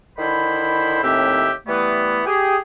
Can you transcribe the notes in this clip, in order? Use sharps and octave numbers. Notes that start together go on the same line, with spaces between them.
D3 D#3 E4 C5 B5
D#2 A2 C4 G4 E5
E3 G3 A3 B3
G4 G#4